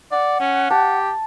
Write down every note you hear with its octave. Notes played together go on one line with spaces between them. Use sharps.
D5 F#5
C#4
G4 A5